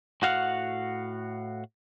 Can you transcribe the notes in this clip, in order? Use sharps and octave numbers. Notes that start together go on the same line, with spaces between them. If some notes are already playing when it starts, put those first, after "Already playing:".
A2 F#4 F5 F#5